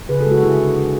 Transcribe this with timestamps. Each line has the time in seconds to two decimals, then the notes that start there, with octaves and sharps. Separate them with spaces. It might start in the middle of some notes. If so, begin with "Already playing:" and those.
0.09 C#3 G#4 B4
0.21 F#4 A4
0.26 G#3
0.32 F#4 A4
0.43 D3 E4 G#4